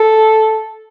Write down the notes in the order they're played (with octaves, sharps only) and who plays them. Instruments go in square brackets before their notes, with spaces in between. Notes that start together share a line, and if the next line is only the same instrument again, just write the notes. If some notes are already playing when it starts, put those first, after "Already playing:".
Already playing: [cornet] A4